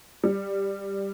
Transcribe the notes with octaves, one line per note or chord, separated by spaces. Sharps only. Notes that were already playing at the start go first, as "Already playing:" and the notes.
G3